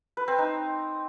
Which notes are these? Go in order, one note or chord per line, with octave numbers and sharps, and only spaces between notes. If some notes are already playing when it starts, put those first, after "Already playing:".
B4
C4
D#4